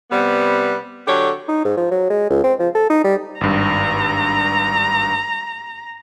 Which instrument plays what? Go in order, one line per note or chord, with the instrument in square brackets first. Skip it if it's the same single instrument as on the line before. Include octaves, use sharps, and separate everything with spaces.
[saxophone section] C3 G3 B3
D3 F#3 G4 A4 C#5
[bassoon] D#4
G#2
F3
F#3
G#3
C#2
C4
F3
A4
D#4
G3
[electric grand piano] G#1 G2 [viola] A#5